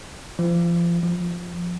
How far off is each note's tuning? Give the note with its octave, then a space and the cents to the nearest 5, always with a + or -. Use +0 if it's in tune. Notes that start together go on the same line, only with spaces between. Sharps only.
F3 -30
F3 +10